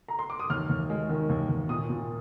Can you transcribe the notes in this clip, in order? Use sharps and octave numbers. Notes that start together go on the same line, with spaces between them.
A#5
C6
D6
D#6
D#2 F6
D#2
G#3
D#3
D#2
D#2
A#2 D#6
A#2